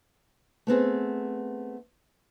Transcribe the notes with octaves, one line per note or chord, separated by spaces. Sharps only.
A3 B3 C4 G#4